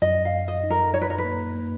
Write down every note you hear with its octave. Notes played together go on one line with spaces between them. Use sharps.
F#2 D#5
F5
F#2
D#5
D#4
A#4
D#4 C#5
B4
A#4
B4
A#3
A#3